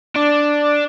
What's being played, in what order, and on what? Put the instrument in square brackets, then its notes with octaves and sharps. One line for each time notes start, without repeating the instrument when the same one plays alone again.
[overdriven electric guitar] D4 [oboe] D5